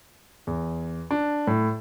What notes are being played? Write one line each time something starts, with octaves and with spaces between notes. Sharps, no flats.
E2
D4
A2